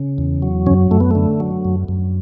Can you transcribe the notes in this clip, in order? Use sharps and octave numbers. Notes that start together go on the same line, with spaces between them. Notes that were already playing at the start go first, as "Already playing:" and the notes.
Already playing: C#3
E2
F#3
F#2 C#3 C#4
F#2 A3
B3
D3 A3
F#3
F#2
F#2